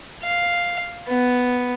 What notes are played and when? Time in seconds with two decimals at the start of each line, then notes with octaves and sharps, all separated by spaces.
0.24 F5
1.08 B3